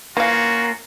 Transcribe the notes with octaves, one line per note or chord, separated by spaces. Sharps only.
E3 A#3 C#4 F4 F#4 F5